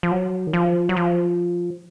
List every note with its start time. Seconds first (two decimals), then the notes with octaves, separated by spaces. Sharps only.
0.03 F3
0.12 F#3
0.47 D#3
0.53 F3
0.89 F#3
0.96 F3